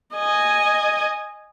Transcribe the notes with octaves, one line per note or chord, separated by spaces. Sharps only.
D#5 G#5